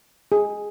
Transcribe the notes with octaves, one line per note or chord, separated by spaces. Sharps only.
G#4